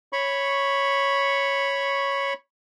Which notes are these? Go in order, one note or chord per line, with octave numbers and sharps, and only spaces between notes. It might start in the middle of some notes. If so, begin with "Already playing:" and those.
C#5 B5 C#6